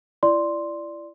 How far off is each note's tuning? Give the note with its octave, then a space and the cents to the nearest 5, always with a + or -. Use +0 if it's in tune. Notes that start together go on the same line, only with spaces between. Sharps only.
E4 +35 D5 +0 C6 +0